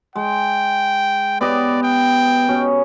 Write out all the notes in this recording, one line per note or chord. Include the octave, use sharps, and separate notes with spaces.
G#3 G5
B3 G4 D5 D#5
G5
B2 C#4